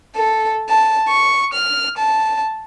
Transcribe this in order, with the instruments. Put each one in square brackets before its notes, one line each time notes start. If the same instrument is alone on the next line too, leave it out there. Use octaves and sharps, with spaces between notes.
[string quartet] A4
A5
C#6
F6
A5